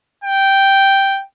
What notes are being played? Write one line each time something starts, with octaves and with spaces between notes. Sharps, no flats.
G5